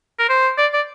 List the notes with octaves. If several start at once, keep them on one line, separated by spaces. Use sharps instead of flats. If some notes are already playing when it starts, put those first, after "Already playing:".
A#4
C5
D5
D5